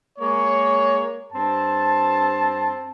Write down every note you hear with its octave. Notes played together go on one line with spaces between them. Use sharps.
G#3 A#3 C#5
G2 C4 A5